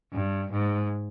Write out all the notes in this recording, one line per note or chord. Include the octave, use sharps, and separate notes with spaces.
G2
G#2